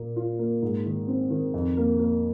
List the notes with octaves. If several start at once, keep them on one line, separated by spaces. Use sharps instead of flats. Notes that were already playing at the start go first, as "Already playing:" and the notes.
Already playing: A#2 A#3
F4
A#3
G#2
D#3
C4
D#3
F2
A#3
A#3